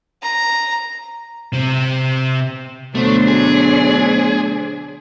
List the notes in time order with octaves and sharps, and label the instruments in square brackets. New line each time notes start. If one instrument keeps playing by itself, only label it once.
[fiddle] A#5
[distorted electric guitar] C3 C4
[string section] D2 C5 [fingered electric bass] B2 [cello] F#3 D4 [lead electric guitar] A3
[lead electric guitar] G#4